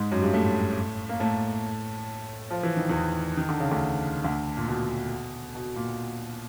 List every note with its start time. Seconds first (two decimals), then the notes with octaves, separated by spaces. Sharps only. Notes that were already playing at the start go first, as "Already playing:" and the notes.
Already playing: G#2 G#3
0.12 F#2 F#3
0.22 G2 G3
0.33 A2 A3
1.09 A#3
1.20 A2 A3
2.51 F3
2.63 E3
2.77 D#3
2.89 E2 E3
3.37 D#3
3.49 D3
3.60 C#3
3.71 D2 D3
4.24 D2 D3
4.57 A#2
4.68 B2
5.55 B2
5.76 A#2